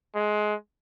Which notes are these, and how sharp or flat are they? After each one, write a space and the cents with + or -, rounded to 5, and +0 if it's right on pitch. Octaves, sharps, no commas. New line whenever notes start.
G#3 +20